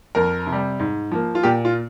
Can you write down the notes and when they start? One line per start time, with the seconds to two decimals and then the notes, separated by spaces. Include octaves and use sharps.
0.15 F2 A#4
0.47 C3
0.52 G3
0.79 G#2
1.12 F3 A#3
1.35 F4
1.43 A#2 G4
1.65 F4